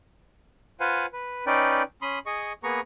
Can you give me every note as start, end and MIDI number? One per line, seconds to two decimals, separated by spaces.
0.80 1.06 65
0.80 1.06 71
0.80 1.06 72
0.80 1.06 77
0.80 1.06 78
0.80 1.06 80
1.13 1.45 71
1.46 1.83 61
1.46 1.83 63
1.46 1.83 71
1.46 1.83 74
1.46 1.83 79
2.02 2.19 61
2.02 2.19 83
2.02 2.19 84
2.02 2.19 87
2.26 2.53 68
2.26 2.53 75
2.26 2.53 85
2.64 2.80 58
2.64 2.80 59
2.64 2.80 68
2.64 2.80 71
2.64 2.80 82
2.64 2.80 85